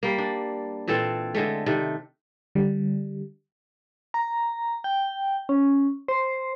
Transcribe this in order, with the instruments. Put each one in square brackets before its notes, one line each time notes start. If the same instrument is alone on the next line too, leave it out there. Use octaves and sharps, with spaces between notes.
[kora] G3 A#3
D4
A#2 E3 C4 A4
D3 G#3 A3
C3 D#3 A3
[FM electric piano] D3 G3
[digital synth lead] A#5
G5
C#4
C5